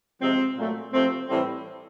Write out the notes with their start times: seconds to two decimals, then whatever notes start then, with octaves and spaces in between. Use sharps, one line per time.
0.20 C3 F3 G#3 C4
0.56 A#2 F#3 A3
0.92 C3 F3 A3 C4
1.28 A2 E3 G3 C4